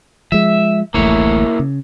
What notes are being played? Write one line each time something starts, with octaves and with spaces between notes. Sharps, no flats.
F3 G#3 E5
D1 A1 A3 A#3 E4 C#5
C#3